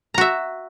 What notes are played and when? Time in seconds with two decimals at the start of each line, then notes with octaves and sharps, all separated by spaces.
0.14 A#5
0.18 F#4
0.21 E5